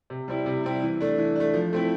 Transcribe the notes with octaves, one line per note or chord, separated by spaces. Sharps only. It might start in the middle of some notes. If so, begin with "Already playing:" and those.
C3
G3 C4 E4
C3
G3 C4 E4
E3
A3 D4
E3
A3 D4
F3
A3 C4 E4